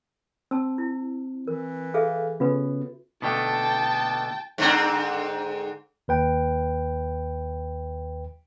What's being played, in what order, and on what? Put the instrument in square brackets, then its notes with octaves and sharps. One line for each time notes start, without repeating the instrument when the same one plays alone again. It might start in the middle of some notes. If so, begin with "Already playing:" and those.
[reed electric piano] C4 [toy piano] A5 E6
[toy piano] E4
[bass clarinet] E3 [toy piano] A#4
[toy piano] G#4 A4 E5 [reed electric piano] F5
[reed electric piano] C#3 B3 C#4 [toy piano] F4 F#4 B4
[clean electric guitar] B2 D3 A3 [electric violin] G5 A5
[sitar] G#2 D3 C4
[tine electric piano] D#2 B4 G5